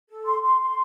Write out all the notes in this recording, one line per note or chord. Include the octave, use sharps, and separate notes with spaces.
A4
C6
C6
C6